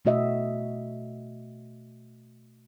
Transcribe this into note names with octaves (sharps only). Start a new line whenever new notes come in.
B2 A3 F#4 D#5 E5